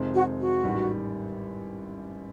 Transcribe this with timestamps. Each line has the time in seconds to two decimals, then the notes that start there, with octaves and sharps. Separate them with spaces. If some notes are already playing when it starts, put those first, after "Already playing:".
Already playing: F2 C3 D#3 G#3 C4
0.15 F#4
0.39 F#4
0.64 A1 G#2 D#3 G3